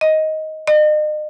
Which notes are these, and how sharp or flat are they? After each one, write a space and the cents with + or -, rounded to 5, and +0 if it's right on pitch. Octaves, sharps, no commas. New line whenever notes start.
D#5 +10
D#5 -40